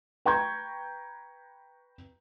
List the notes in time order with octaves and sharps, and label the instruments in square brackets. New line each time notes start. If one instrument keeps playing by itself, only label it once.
[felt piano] B4 G5 A#5 C#6 G6 G#6